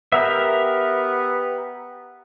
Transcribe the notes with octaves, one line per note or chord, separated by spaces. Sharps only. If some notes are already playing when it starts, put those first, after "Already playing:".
B3 G4 A#4 E5